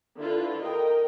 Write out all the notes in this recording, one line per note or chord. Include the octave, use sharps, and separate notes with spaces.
D3 E4 F4 A4 B4
A#4 D#5 G5